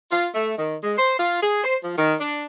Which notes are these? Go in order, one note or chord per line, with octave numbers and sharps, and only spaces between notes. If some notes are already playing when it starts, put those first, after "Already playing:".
F4
A3
D#3
G#3
C5
F4
G#4
C5
F3
D#3
D4